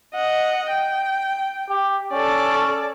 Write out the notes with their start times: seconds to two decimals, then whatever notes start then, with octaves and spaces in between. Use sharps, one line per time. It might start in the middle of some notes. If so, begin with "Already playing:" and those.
0.15 D#5 F#5
0.69 G5
1.70 G4
2.13 C#4 A4 D5